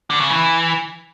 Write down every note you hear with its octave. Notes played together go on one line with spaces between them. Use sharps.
D3
C#3
E3